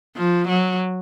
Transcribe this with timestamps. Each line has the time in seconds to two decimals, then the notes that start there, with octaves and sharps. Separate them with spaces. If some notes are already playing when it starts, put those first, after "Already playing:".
0.17 F3
0.48 F#3